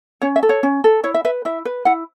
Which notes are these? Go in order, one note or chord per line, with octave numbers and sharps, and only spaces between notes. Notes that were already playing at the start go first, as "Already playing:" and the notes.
C#4 C#5
E5
A4
C#5
C#4
A4
E4 C#5
E5
B4 E5
E4 E5
B4
E4 F#5